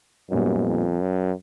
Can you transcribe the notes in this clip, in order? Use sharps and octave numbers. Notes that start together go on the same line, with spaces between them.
F#2 A#2 G3 B3 D#4
F2
F#2